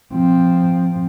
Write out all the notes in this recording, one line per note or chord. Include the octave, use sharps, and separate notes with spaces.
F3 C4